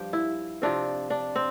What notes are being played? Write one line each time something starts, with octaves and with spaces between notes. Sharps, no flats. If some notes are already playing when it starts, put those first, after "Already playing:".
Already playing: G2 F3 G4
E4
C3 F3 C4 D4
D4
C4